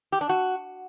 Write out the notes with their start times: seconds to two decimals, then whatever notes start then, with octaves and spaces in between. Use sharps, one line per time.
0.12 G4
0.21 D4
0.29 F#4